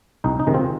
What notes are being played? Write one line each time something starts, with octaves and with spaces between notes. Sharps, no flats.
C2 D#4
D#4
C3 D#3 G#3
C4 F4